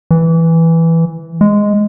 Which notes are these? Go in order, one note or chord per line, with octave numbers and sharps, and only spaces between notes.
E3
G#3